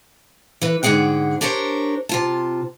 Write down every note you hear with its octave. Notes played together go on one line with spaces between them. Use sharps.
E3 B4
G#2 D3 G#3 G#4 F#5 G5
D4 G4 A#4 C5 C#5
C3 F4 A5